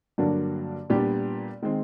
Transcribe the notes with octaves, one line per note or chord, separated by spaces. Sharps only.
G2 D3 F#3 A#3 D4
A#2 G3 B3 D4 G4
D#3 G#3 C4